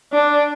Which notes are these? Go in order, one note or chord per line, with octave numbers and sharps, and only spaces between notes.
D4